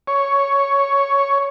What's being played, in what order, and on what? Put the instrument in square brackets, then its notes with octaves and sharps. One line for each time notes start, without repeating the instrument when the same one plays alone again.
[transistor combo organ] C#5